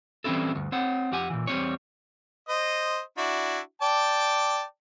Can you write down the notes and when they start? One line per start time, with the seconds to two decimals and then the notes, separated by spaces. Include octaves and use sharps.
0.24 E3 G3 C4 C#4 E4 A4
0.55 D2 G2
0.72 C4 C#5 F#5
1.12 F2 G4 F#5 G#5
1.30 A#2 E3
1.47 E2 G3 C4 D4 C#5
2.49 C5 D#5
3.18 D4 E4 F#4
3.82 D5 G5 A5